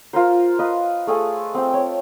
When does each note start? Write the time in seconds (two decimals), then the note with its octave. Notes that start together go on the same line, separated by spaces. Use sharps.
0.13 F4 A#4 C5
0.59 B4 D#5 F5
1.07 A3 G#4 A4 G#5
1.54 C4 G5
1.74 C#5